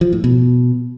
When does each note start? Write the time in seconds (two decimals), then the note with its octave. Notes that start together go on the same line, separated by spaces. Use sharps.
0.01 F3
0.12 A2
0.24 B2